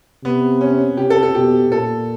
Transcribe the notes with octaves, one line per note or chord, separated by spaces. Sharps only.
C3 B3
C#4
C3 G4
A4
A4
B2 G4
A#2 A4